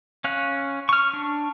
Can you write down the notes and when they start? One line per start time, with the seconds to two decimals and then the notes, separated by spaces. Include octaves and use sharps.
0.24 C#4 F5 F#6
0.89 C#6 F6
1.13 D4